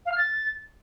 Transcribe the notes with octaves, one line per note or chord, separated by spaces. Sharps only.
F5
F6
A6